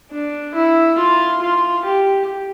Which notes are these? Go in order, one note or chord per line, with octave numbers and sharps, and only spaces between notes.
D4
E4
F4
F4
G4